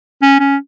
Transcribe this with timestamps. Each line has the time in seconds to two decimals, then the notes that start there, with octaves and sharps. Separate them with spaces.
0.22 C#4
0.40 C#4